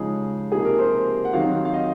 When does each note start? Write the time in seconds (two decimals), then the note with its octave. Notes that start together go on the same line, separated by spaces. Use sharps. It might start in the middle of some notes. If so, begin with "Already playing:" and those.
Already playing: C#3 F3 G#3 D#4 G#4
0.51 C3 F3 A#3 D#4 G#4
0.65 A#4
0.79 C5
1.25 F#5
1.33 D#3 F#3 C4 D#4 F5
1.65 F5
1.74 D#5